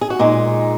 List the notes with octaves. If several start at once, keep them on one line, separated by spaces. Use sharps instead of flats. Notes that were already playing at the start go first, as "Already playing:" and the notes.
G#4
F#4
A#2 G#3 D#4